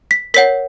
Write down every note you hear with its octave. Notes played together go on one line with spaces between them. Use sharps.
B6
A#4 C#5 F#5 B6